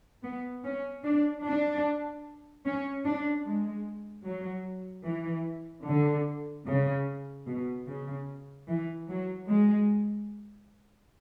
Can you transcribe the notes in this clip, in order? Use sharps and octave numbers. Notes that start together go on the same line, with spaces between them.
B3
C#4
D4
D4
C#4
D4
G#3
F#3
E3
D3
C#3
B2
C#3
E3
F#3
G#3